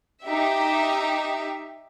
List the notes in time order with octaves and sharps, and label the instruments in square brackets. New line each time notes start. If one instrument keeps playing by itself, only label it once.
[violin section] D#4 G4 E5